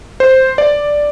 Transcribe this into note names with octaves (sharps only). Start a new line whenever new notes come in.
C5
D5